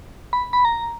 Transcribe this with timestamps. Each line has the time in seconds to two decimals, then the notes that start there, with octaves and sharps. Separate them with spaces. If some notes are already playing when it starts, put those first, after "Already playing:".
0.33 B5
0.53 B5
0.65 A#5